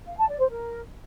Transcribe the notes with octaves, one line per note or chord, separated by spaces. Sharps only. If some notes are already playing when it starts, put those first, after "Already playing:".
F5
A5
D5
C5
A#4